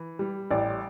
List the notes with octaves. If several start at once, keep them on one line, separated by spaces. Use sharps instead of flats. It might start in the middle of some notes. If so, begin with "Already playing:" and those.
Already playing: E3
G3
A1 D5